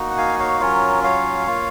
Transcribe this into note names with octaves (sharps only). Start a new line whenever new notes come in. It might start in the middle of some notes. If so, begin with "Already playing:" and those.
Already playing: A#3 D#4 F#4
F#5
F5 G#5
C#5 F5
F#3 C#4 F4 A#4 C#5
C#5 F5
A#3 F4